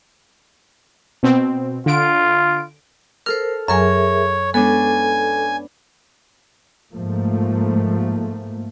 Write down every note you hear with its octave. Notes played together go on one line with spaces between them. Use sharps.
B2 C4
D3 F4 D7
A4 A#4 C5 F6
F#2 F#3 G#4 A#4 C#5 E5 G#5
G#3 B3 C#4 D4 A4 G#5
G#2 F3 A3 A#3